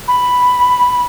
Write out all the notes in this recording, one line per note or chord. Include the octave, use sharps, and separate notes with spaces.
B5